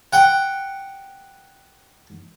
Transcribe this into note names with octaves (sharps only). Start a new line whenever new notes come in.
F#5 G5